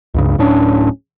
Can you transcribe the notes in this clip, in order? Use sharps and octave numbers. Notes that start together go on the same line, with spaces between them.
C#2 G2 C#3
D1 A2 C#4 D4